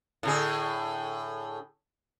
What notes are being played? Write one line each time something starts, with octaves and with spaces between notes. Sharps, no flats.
A2 D3 G#4